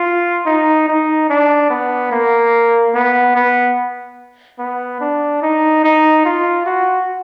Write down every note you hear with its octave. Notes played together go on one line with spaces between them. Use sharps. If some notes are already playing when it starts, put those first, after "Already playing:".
Already playing: F4
D#4
D#4
D4
B3
A#3
B3
B3
B3
D4
D#4
D#4
F4
F#4